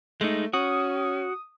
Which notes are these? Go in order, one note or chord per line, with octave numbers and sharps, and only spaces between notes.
G#3 A3 D#4
C#4 F#4 D#6